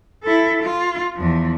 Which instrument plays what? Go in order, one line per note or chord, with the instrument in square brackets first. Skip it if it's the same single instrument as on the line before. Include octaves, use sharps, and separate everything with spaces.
[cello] E4 A4
F4
E2 F3